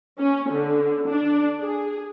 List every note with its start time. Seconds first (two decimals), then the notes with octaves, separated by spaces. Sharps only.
0.19 C#4
0.51 D3
1.08 D4
1.61 G#4